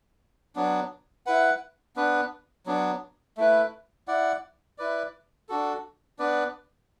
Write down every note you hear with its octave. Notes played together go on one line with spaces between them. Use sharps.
F#3 B3 D4
E4 B4 F#5
B3 D4 B4
F#3 B3 D4
A3 E4 B4
E4 D5 F#5
E4 B4 D5
D4 F#4 A4
B3 D4 B4 D5